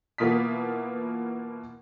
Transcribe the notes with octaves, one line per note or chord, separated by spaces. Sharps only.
B2 E3 A#3 F4 D#6 B6